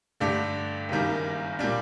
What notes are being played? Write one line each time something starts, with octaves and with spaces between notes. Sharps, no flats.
G2 D3 A3 D4 G4
F#1 F#2 D#3 G3 A#3
A#2 G3 D4